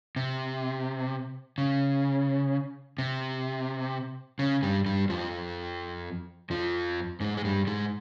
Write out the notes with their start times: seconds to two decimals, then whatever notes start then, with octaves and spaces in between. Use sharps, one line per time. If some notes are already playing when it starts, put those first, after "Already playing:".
0.16 C3
1.58 C#3
2.98 C3
4.39 C#3
4.63 G2 G3
4.86 G2 G3
5.10 F2 F3
6.50 F2 F3
7.20 G#2 G#3
7.37 G#3
7.45 G2 G3
7.67 G#2 G#3